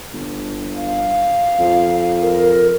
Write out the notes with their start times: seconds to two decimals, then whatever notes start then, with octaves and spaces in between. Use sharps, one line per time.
0.14 G1
0.80 F5
1.59 F2
2.23 A#4